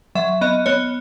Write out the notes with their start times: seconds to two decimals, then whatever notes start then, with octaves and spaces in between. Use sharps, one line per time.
0.15 F#3 E5
0.41 B3 D#5
0.66 B3 C#5